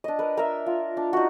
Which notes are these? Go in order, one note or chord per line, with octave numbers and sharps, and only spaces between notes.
D4 D#5
A#4 B4
A#4 E5
F4
D4
D#4 F#4